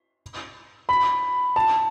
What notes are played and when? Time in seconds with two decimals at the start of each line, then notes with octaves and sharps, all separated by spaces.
0.89 B5
1.56 A5